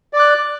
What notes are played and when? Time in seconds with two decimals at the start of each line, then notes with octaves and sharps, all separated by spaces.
0.13 D5
0.16 D6
0.19 F#6